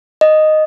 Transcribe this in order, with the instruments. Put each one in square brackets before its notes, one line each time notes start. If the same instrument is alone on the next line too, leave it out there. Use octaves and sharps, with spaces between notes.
[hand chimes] D#5